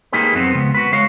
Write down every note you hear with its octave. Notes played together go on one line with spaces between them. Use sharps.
A#3 D#4 G4 G#4 B4
F2 F#3 B3 C4
C#2 B3
F#4 B4
G#3 F#4 C#5 F5